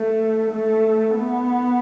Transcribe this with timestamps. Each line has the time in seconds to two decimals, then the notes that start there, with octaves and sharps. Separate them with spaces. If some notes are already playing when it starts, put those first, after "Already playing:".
Already playing: A3
0.51 A3
1.16 B3